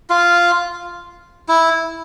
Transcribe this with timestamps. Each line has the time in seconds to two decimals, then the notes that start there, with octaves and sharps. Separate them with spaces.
0.10 F4
1.48 E4